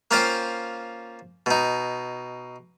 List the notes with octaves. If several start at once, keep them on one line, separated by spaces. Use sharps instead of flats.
A#3 C#4 F4 C5 G5
B2 D#4